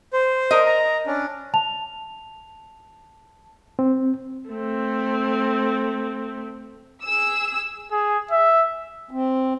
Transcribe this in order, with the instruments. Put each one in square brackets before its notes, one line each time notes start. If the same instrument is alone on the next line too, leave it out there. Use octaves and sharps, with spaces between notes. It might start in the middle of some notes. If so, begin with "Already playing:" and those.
[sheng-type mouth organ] C5
[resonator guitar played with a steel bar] A#4 D#5
[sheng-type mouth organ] A#5
C#4 D4
[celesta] A5 F7
[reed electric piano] C4
[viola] A3 C4
[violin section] G#4 E6
[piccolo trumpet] G#4
E5
[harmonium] C4